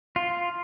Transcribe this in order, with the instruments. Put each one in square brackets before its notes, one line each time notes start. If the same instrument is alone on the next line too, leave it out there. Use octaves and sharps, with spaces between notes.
[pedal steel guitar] F4